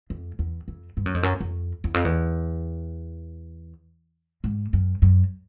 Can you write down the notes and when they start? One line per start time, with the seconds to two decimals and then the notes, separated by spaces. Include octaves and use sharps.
0.10 F2
0.39 E2
0.68 F2
0.97 G2
1.06 F#2
1.14 F2
1.23 F#2
1.41 F2
1.84 E2
1.94 F2
2.05 E2
4.44 G#2
4.73 F#2
5.02 F#2